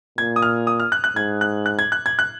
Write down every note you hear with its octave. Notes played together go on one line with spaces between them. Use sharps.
A#2 G#6
D#6
F6
D#6
F6
F#6
F#6
G#2 G#6
F#6
F#6
G#6
F#6
G#6
F#6